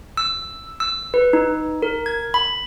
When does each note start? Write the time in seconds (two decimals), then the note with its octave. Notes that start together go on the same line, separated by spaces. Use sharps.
0.17 E6
0.80 E6
1.14 B4
1.33 D#4
1.82 A#4
2.06 G#6
2.34 B5